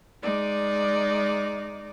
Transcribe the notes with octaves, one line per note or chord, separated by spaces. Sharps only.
G#3 D#4 D5 D6